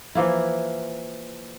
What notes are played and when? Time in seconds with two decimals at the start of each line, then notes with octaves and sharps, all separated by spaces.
0.15 E3 F3 A#3 E4